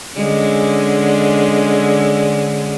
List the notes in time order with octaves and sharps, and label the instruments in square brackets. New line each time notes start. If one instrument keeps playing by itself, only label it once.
[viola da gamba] D3 G#3 C#4